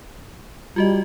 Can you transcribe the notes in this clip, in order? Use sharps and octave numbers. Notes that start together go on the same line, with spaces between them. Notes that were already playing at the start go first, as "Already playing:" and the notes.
G3 F4 F#4 D#5